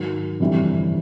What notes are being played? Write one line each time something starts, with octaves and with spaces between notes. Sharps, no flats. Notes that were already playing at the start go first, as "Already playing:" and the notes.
Already playing: G#2 D#3 F#3
G1 F2 C3 E3 G3